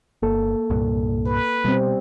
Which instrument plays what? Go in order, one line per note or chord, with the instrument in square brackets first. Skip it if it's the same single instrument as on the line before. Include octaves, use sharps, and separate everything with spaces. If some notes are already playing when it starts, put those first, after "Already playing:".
[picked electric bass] G1 [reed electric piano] A#3 A4
[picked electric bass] C2 G2 A#2
[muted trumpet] B4
[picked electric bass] B2 [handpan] G3 C4